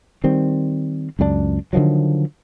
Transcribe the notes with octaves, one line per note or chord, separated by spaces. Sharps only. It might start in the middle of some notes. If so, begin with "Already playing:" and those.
D#3 G3 C4
C#2 F#2 G3 D4
D3 D#3 F3 F#3